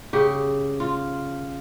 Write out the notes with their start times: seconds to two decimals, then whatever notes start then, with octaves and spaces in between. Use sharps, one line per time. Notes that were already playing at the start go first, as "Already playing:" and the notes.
0.13 C#3 G4
0.80 F4